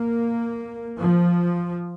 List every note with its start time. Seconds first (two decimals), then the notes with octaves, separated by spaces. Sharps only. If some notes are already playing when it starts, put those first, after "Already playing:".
Already playing: A#3
0.99 F3